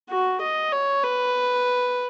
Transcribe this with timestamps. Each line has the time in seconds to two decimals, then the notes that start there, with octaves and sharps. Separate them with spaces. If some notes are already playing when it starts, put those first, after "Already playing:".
0.10 F#4
0.41 D#5
0.72 C#5
1.04 B4